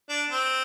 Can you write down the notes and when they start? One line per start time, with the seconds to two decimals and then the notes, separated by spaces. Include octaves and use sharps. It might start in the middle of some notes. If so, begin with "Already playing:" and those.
0.09 D4
0.29 C4